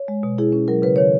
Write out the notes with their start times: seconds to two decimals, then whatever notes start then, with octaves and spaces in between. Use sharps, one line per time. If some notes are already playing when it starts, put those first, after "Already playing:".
Already playing: C#5
0.08 G#3
0.23 B2
0.38 E4 G#4
0.53 C#4
0.68 F#3 A#4
0.82 C#3 B4
0.96 D#3 C#5